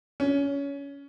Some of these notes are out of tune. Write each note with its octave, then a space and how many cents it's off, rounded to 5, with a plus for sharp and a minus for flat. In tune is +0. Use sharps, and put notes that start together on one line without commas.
C#4 +20